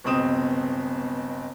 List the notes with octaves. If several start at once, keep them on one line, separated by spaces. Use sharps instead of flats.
G1 C#2 B2 C4 D#6 E7